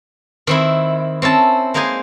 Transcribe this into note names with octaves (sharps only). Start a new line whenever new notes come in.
D#3 C4 E4
C4 C#4 E4 A5
G#3 A#3 D#4 C5 D#5 G#5